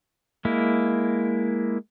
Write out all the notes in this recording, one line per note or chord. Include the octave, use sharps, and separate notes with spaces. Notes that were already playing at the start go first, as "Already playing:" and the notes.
G#3 A#3 E4